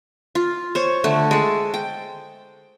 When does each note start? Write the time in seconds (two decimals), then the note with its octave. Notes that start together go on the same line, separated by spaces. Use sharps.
0.35 F4
0.75 C5 C#5
1.04 D3 A3
1.31 G#3 A4
1.74 G5